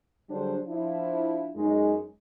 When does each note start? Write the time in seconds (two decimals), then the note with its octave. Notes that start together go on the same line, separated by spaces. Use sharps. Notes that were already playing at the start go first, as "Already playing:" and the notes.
0.30 D3 F#3 G3 D4 G#4 C5
0.67 F3 D4 E4
1.55 F#2 G#3 D#4